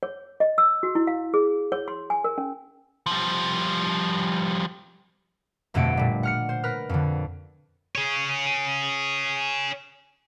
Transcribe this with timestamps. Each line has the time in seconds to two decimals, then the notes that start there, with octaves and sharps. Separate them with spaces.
0.03 C#5
0.40 D#5
0.58 E6
0.83 F#4
0.95 E4
1.07 F5
1.34 G#4
1.72 C#5
1.88 C6
2.10 G#5
2.24 A#4
2.38 C#4
3.06 F3 G3
5.74 G1 F2 B2 A3 F#5 D7
5.97 A#2 G3
6.23 F#5 F6 C#7
6.49 C5
6.63 A#4 B4 F6 F#6
6.89 F2 D3
7.95 G#4 C#5